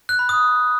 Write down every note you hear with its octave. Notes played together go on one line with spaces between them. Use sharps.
F#6
B5
D#6